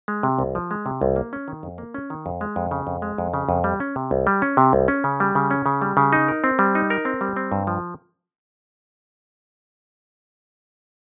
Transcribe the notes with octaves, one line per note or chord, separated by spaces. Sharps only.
G#3
C3
C2
F3
G#3
C3
C2
A#3
C#4
D#3
F2
A#3
C#4
D#3
F2
G#3
F2
C#3
F2
G#3
F2
C#3
F2
G3
C#4
C3
C2
G3
C#4
C3
C2
C#4
C#3
G3
C#3
C#4
C#3
G3
C#3
D#4
A#4
C4
G3
D#4
A#4
C4
G3
C4
G2
F3